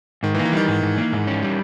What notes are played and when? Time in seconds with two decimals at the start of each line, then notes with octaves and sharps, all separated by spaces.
0.23 G#2 D#3
0.35 E3
0.38 A#3
0.45 E3
0.52 D#3 G3
0.68 G#2
0.83 G#2
0.98 A#3
1.12 G#2
1.27 C#4
1.43 G3